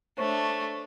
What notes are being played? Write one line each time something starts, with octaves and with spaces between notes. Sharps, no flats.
A3 D4 C5 C#5 C#6